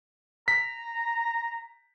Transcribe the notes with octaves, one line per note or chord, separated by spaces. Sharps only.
A#5 B6